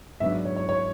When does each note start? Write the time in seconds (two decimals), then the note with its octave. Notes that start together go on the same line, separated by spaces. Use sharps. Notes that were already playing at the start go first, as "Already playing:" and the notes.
0.20 G#2 F#3 B3 D4 E5
0.32 D5
0.45 C#5
0.56 C#5
0.69 C#5